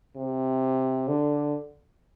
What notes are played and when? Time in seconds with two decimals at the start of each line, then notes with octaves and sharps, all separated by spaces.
0.17 C3
1.08 D3